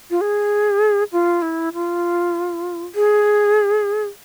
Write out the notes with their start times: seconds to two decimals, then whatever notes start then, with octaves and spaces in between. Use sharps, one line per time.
0.10 F4
0.21 G#4
1.12 F4
1.42 E4
1.74 F4
2.95 G#4